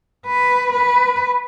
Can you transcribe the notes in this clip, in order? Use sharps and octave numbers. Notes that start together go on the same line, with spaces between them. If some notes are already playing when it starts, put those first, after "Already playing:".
B4
B4